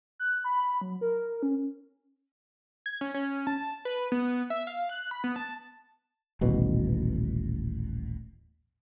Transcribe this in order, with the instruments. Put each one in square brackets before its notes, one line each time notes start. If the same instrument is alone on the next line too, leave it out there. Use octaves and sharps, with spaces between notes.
[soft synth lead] F#6
B5
F#3
A#4
C#4
[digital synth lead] G#6
C#4
C#4
A5
B4
B3
E5
F5
F#6
B5
B3
A5
[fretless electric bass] D#1 A1 B2